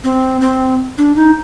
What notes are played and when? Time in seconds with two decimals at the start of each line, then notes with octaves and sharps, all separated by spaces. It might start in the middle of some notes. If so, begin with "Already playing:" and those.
0.04 C4
0.41 C4
0.98 D4
1.16 D#4